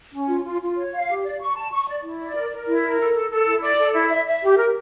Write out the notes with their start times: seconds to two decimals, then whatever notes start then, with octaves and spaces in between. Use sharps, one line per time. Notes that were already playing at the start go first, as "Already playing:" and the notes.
0.13 C#4
0.28 F4
0.45 F4
0.61 F4
0.77 C#5
0.93 F5
1.08 G4
1.24 D5
1.41 C#6
1.56 A5
1.72 C#6
1.87 D5
2.03 E4
2.20 D5
2.35 A#4
2.52 A#4
2.67 E4
2.83 A#4
2.99 A4
3.15 A4
3.30 A4
3.46 E4
3.62 D5
3.78 A4
3.94 E4
4.09 E5
4.26 E5
4.42 G4
4.57 A#4